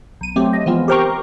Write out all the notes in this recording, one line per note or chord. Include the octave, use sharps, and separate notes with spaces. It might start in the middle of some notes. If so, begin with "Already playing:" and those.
B1 D#7
F#3 A3 C4 G4
D#5
E3 F3 G#3 B3 C4 F4
G4 A#4 C5 G5 A#5 C#6